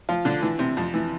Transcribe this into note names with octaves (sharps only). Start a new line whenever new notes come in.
F3 F4
D3 D4
E3
C3
F2
E3